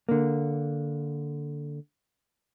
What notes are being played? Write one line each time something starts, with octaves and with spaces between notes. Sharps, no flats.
D3 A#3